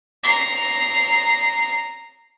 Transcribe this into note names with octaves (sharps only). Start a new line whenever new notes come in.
A#5 C7